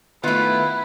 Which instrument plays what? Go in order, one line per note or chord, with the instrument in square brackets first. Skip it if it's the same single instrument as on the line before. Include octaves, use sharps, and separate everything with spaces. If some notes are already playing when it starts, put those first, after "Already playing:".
[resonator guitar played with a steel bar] D#3 F4 [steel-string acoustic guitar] A3 B3 [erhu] E4 [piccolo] F#6